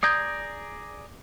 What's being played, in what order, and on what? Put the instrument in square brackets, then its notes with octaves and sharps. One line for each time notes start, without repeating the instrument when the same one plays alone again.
[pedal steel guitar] G#4 D5 A#5 [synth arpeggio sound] D#6 G6 G#6